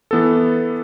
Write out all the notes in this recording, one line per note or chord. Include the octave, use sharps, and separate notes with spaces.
E3 B3 A4